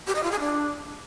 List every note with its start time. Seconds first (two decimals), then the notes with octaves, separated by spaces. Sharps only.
0.07 G4
0.15 D#5
0.23 F4
0.31 G#4
0.40 D4